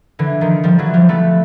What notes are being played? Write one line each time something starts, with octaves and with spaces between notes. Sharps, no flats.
D3 E3
D#3 F3
F3 G3
E3 F#3
F3 G3
A3 B3